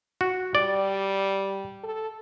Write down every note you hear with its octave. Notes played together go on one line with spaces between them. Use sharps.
F#4
G3 D5
A4